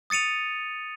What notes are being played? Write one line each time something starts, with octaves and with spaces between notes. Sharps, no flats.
D#6 A6 C#7 D#7 F7